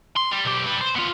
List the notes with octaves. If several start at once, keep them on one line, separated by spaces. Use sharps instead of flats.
C6
G3
B1 G4
G3 B4
C5
B3 F4